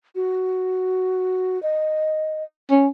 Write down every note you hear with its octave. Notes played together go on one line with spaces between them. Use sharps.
F#4
D#5
C#4